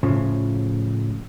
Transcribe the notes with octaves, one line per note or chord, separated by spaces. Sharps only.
A2 C#3 F3